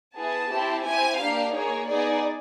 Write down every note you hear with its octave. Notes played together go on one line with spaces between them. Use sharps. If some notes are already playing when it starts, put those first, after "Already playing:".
B3 E4 G#4 A5
C4 E4 G4
C4 E4 G4 G#5
A#3 D4 G4 F5
A#3 D#4 G#4 C#5
B3 D#4 G#4 D5